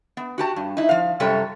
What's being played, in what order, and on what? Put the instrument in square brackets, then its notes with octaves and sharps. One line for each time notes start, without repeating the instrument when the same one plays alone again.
[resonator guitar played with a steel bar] B3
F#4 G4 A5
G2
D#4 E4
F3 F5
F#2 C3 G3 A4 C#5